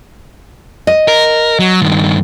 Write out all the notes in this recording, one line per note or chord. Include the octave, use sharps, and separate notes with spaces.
D#5
A#4
F#3
G2 D#3